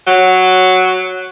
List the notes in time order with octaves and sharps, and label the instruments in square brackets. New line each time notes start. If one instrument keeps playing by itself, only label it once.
[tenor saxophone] F#3